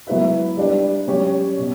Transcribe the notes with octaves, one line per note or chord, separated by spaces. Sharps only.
F#3 B3 E4 B4 E5
G3 D4 G4
F#3 C#4 G4 C#5
B2